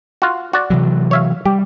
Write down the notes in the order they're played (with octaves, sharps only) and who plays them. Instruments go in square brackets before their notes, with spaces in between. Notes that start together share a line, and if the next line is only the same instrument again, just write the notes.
[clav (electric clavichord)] F4 F#4
F#4 D5
[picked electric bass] C3 E3 F#3
[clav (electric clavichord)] C#5 E5 F5
[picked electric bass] G3 [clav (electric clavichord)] G4